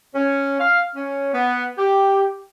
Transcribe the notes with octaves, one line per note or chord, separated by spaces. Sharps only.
C#4
F5
C#4
B3
G4